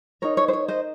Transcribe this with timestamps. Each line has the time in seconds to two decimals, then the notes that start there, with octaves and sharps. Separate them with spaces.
0.22 D#4 A#4 C#5
0.37 C#5
0.48 C5
0.53 C#5
0.68 C5 D#5